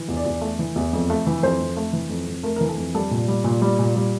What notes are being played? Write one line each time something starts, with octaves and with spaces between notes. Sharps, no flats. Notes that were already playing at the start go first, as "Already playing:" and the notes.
Already playing: E3
E2
D5
E2
A3
E3
E2
F2
A3
E3
F2 C5
F2
A3
E3
F2
F2
A3 A#4
A#4
E3
A4
F2
G3 A4
A#2
G3
A#2
G3
A#2
G3